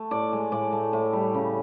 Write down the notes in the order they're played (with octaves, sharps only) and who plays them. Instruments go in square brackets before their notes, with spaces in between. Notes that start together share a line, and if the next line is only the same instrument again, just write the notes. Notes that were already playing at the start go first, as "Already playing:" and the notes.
Already playing: [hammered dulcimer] A3
A2 D5
G#3
A2 D5
A3
A2
G3
C#3